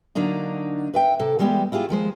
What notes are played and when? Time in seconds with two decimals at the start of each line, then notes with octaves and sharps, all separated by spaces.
0.15 D3 F#3 A#3 D4 D#4
0.94 B4 E5 G5
1.19 C3 A4
1.39 E3 G3 G#3 B3 G4
1.72 E4 F4 G4 G#4
1.89 D#2 F3 G#3 C5